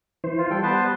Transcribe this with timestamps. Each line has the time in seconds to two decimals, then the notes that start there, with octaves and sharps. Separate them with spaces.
0.24 E3 C5
0.38 F4
0.50 G3 A4 G5
0.63 B3 B4 C5 A5 C6